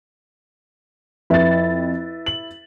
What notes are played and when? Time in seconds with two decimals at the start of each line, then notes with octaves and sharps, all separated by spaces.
1.30 F2 E4 B4 E5 A6
2.26 F#7